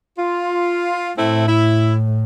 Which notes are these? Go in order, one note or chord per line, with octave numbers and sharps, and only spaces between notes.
F4
A2 A3 C4 E4
E4